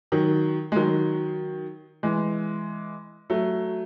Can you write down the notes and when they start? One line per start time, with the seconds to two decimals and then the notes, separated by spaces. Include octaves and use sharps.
0.12 D#3 F#3
0.72 G#3
0.76 D#3 F#3
2.03 E3 G#3
3.30 F#3 A3